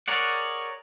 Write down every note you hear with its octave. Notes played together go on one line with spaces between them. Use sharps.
G#4 A#4 C#5 D5 F#5